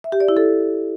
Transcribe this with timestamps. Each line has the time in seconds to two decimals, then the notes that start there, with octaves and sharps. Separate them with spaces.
0.04 E5
0.12 G4
0.20 D5
0.28 E4
0.37 A4